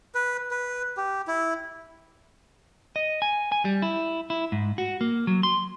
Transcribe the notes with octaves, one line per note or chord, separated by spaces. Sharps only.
B4
B4
G4
E4
D#5
G#5
G#5
G3
E4
E4
G#2
F#4
A#3
F#3
C6